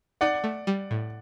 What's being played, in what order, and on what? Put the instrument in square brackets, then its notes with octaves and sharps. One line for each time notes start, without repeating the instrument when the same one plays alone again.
[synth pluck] D#4 [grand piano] D5 F#5
[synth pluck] A3
G3
A2